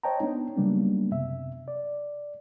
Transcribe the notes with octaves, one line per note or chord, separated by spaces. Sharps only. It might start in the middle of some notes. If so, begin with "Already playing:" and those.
C5 C#5 D#5 G5 A5 A#5
B3 D4 D#4
C#3 F#3 G3 A#3 B3 D4
F#2 C3 E5
D5